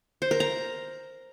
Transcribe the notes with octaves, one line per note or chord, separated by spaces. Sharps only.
C5
A#4
A#5